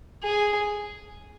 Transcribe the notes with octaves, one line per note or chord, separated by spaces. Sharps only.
G#4